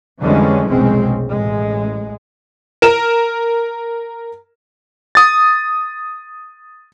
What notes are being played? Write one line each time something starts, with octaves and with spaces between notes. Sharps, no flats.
F2 D3 E3 G3 G#3 C#4
F1 B1 G#3 C4 C#4
A1 G#3
A#4 E7
D#6 A6